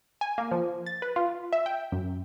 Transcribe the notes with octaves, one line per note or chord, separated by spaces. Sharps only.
G#5
A#3
F3
A6
B4
F4
E5
G5
F#2